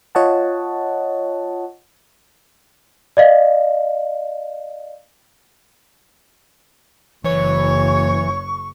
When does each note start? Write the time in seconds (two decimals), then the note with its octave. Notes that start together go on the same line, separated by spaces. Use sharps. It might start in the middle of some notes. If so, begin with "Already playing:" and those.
0.15 F4 C#5 D#5 F#5 A5
3.17 D5 D#5 F5
7.24 F#1 E3 C#5 C#6